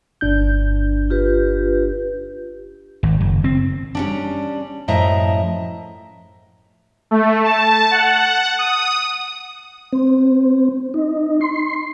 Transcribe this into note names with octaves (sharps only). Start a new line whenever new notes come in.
G1 D4 G6
F4 G4 B4
G#1
F#1
C4
G3 C#4 D4
F#2 A2 F3 D#5 E5 A#5
A3
A5
F#5
D#6
C4
D#4
C6